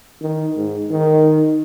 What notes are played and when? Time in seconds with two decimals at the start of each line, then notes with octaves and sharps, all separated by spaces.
0.21 D#3
0.57 G#2
0.91 D#3